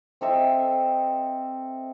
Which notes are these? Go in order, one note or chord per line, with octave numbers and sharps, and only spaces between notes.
C4 A4 D#5 E5